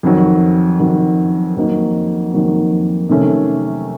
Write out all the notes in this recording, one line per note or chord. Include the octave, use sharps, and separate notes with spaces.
F2 D#3 F#3
F2 D#3 F#3
F2 D#3 F#3 A#3 D#4
F2 D#3 F#3 A#3 D#4
C3 D#3 A3 C#4